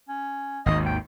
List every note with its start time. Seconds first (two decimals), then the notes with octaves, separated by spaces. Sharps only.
0.09 C#4
0.66 G#1 D#2 D#3 D#5
0.86 G5